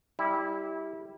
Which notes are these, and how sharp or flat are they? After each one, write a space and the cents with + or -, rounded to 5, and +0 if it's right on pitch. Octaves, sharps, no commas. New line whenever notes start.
G3 +0 E4 -20